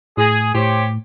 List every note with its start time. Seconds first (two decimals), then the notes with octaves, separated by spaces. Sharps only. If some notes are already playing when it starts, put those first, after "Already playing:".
0.17 A2 G#4
0.55 A2 G4 C5 C#5